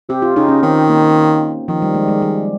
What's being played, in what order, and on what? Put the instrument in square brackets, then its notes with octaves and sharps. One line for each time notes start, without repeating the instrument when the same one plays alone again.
[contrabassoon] C3 [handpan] G4
[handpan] F4
[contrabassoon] C#3 [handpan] D#4
[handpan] C#4
[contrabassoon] D#3 [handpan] C4
[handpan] A#3
[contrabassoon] D#3 [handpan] F3
[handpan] G3
G#3
G#3
G3